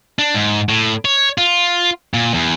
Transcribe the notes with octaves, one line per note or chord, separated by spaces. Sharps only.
D4
G#2
A2
C#5
F4
A#2
E2